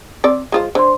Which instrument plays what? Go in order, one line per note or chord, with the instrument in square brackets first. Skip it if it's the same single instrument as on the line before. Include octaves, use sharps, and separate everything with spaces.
[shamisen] C4 D5
G#3 F4 C5
[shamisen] D3 [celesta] C5 C6